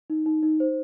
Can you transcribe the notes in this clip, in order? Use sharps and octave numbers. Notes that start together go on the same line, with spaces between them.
D#4
D#4
D#4
C5